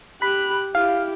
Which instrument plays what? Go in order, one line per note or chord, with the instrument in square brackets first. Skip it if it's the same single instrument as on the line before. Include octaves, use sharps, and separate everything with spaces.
[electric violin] G4 F#6 [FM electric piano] B5
[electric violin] E4 G4 [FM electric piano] F5